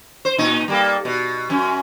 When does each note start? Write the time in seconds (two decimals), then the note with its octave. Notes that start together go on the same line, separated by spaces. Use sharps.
0.25 C5
0.38 A#2 D#4
0.68 G3 A#3 A4
1.05 B2
1.50 F#2 C#4